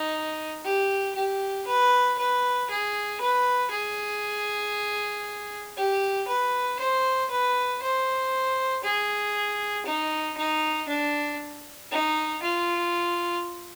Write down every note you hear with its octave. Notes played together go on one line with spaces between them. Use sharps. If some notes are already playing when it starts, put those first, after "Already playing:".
Already playing: D#4
G4
G4
B4
B4
G#4
B4
G#4
G4
B4
C5
B4
C5
G#4
D#4
D#4
D4
D#4
F4